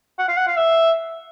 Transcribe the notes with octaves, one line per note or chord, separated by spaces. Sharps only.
F#5
F5
F#5
F5
E5